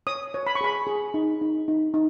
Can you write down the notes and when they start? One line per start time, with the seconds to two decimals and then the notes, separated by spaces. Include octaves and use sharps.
0.07 C#5 D#6
0.34 C#5
0.47 B5
0.55 C#6
0.61 G#4 B5
0.87 G#4
1.14 D#4
1.42 D#4
1.68 D#4
1.94 D#4